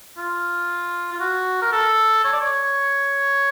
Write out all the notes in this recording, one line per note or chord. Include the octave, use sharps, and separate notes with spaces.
F4
F4
F#4
A#4
A4
C#5
D5
C#5